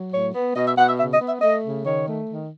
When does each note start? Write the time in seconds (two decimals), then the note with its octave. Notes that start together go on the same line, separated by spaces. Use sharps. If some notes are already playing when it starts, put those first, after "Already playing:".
Already playing: F#3
0.12 A2 C#5
0.34 B3
0.55 B2 D#5
0.66 E5
0.76 B2 F#5
0.87 E5
0.98 C#3 E5
1.12 D#5
1.20 B3
1.27 E5
1.41 A3 D#5
1.63 C#3
1.84 D#3 C#5
2.06 A3
2.28 D#3